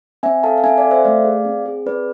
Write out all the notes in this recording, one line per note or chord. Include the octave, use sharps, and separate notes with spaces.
C4 E5 G#5
A4 F5 A5
F5
C4 E5 G#5
D5 F5
A4
C5 E5
A3 D5 F5
G#4
C4
G#4
C4 B4 D5